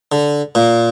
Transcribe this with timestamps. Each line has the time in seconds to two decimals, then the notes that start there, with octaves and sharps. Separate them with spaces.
0.12 D3
0.55 A#2